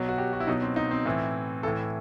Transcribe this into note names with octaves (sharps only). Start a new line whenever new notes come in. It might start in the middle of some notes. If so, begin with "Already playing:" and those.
Already playing: B2 F#3
F#4
G4
F#4
E4
B2 F#3 D#4
C4
D#4
C4
A2 E3
A2 E3 A4